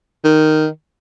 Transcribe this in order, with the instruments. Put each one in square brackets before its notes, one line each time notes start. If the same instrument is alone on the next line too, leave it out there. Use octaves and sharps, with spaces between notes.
[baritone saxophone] D#3